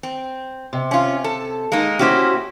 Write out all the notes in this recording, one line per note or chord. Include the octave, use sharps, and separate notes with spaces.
C4
C3
C#4 F4
A4
G#3 A#3 D#4
A#3 C#4 E4 F#4 G4 C5